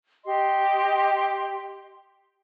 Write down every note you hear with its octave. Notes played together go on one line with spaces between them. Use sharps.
G4 D#5 C6